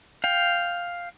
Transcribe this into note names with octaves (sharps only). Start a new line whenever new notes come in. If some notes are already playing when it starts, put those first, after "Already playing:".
F5 G5